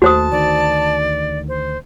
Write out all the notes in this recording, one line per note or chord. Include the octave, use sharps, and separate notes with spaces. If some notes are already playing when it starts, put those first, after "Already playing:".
D#2 A3 F#4 C5 A5 D#6
D2 D#3 D5
C5